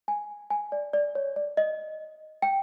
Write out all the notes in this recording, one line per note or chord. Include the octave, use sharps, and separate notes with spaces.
G#5
G#5
D5
D5
C#5
D5
D#5
G5